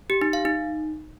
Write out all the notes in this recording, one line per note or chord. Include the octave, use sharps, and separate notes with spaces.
G4
D#4
F5
D#4